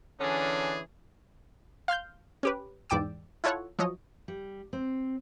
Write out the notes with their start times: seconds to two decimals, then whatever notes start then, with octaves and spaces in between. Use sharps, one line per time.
0.21 D3 E3 C#4 D4 G#4
1.88 F5 C6 F6 G6
2.43 C#4 G4 B4
2.90 E2 G#2 D5 G5 D6 E6
3.44 E4 F4 A4 C#5 F#5
3.79 F3 F#3 C#5 D#5
4.28 G3
4.73 C4